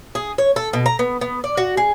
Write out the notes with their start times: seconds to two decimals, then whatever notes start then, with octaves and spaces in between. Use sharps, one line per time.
0.15 G#4
0.38 C#5
0.56 A4
0.73 B2
0.86 A#5
0.99 B3
1.21 B3
1.44 D5
1.57 F#4
1.77 G#4